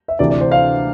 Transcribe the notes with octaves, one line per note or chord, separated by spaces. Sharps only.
E5
D2 C3 E3 D5
D5
C5
F5